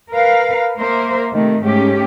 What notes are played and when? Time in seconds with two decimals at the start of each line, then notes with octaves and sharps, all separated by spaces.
0.10 A#4 B4 F5
0.78 A#3 A#4 C5 E5
1.31 C3 D#3 A3
1.62 G#2 A3 C#4 G4